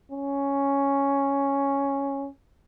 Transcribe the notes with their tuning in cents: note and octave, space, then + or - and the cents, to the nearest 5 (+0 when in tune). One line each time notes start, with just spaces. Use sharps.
C#4 +0